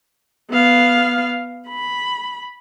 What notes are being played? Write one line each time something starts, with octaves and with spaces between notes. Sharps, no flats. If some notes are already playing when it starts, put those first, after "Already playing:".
B3 F5
B5